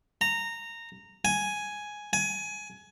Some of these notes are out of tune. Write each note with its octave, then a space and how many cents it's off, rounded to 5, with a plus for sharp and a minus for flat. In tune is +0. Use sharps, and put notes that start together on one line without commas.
A#5 -15
G#5 +5
G#5 +20